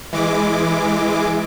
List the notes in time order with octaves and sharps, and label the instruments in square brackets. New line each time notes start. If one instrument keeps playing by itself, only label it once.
[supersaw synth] E3 G#3 D6